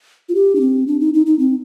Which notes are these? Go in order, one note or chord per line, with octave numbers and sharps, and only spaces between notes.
F4
G4
D4
C4
D4
D#4
D#4
D#4
C4